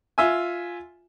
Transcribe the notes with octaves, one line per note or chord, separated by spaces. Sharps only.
F4 E5 G#5